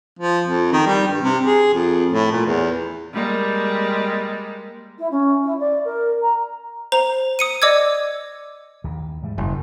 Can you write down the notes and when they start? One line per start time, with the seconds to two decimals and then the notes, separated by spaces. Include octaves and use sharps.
0.19 F3
0.47 F2
0.72 D#3
0.86 G3
1.07 G2
1.21 C3
1.46 G#4
1.73 F2
2.10 A2
2.32 A#2
2.46 E2
3.14 G3 G#3 A#3
4.98 E4
5.11 C#4
5.43 E4
5.59 D5
5.85 A#4
6.22 A#5
6.92 C5 A#5 F7
7.39 D#6 C#7 D#7
7.62 D5 D#5 D6 E6 G#6
8.84 D#2 D#3 E3
9.22 G#2 E3 G3
9.38 F#1